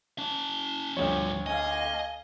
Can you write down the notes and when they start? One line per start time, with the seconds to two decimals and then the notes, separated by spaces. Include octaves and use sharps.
0.18 C#4 A5
0.97 D2 G2 F3 C#5
1.46 D#5 F5 G#5